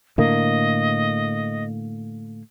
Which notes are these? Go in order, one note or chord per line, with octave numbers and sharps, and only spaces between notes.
A2 D3 A#3 D#5